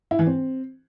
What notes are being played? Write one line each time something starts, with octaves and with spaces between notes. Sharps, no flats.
E4
E3
C4